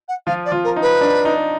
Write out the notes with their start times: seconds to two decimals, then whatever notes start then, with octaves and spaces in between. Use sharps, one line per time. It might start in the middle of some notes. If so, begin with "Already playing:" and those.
0.08 F#5
0.27 F3 F4 F5
0.45 D5
0.52 F3 F4
0.64 A#4
0.76 D#4
0.82 B4
1.01 D4
1.25 D#4